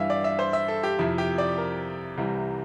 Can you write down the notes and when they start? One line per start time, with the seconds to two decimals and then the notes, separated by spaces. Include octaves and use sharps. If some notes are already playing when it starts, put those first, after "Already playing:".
Already playing: G2 E3 G3 E5 F5
0.10 D5
0.24 E5
0.39 C5
0.53 E5
0.68 A4
0.83 G4
0.99 F2 C3 F3 E4
1.18 G4
1.38 D5
1.58 A#4
2.17 C2 C3 E3 G3